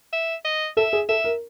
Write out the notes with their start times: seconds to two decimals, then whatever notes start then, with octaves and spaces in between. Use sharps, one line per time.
0.13 E5
0.45 D#5
0.77 A4 E5
0.93 G#4
1.09 A4 E5
1.24 A#4